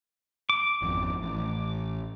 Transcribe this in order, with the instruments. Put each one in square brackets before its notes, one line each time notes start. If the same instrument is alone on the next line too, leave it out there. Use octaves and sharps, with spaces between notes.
[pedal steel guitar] D6
[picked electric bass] G#1 F2
A1